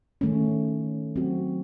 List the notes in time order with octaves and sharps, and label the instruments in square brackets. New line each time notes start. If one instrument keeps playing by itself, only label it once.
[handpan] D#3 A3 C#4
F#3 C4 F#4